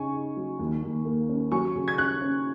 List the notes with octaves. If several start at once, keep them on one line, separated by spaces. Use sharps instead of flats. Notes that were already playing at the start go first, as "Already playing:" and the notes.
Already playing: C#3 D#4 G#5 C#6
D#4
F#3
D#2
D#2
A#3
C#4
F#3 G#5 C#6
C#3
G#6
C#4 C#6 F#6
C#4